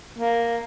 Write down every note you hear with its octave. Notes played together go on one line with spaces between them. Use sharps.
A#3